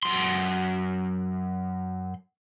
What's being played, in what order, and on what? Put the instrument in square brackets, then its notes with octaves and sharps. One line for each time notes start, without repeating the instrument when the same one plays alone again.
[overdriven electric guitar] F#2 C6